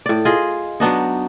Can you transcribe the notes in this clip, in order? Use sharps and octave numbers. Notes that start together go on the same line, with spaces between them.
A2 D5
F4 G#4 D#5
F#3 B3 D4 D#4